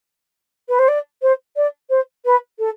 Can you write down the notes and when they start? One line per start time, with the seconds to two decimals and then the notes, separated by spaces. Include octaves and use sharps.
0.68 B4
0.79 C5
0.88 D5
1.22 C5
1.56 D5
1.90 C5
2.25 B4
2.59 A4